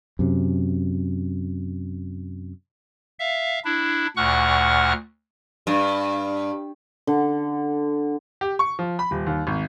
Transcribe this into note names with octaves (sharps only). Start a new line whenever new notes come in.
F#2 C3
E5 F5
D4 E4
D2 A#2 F#5 C#6 F6 F#6
G2
D3
G4
C#6
F3
B5
D#1
D#2
G#1